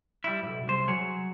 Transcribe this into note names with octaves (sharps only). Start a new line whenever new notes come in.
G3 E4
B1 G2
C2 C5
F#3 G#4 C#5